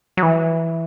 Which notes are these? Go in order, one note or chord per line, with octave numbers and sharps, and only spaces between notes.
F#3
E3